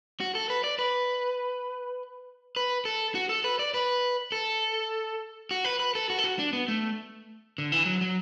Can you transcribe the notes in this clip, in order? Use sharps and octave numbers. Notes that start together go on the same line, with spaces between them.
F#4
A4
B4
D5
B4
B4
A4
F#4
A4
B4
D5
B4
A4
F#4
B4
B4
A4
F#4
A4
F#4
D4
B3
A3
D3
E3
F#3
F#3